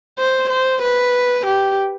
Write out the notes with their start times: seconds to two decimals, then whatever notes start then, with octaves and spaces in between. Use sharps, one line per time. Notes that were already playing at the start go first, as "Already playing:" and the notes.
0.19 C5
0.50 C5
0.83 B4
1.46 G4